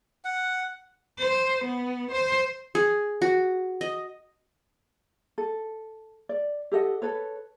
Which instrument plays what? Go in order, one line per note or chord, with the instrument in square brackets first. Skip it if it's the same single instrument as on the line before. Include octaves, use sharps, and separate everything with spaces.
[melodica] F#5
[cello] C5
B3
C5
[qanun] G#4
F#4
D#5
[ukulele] A4
D5
G4 A4 D#5 F#5
A4 B4 C#5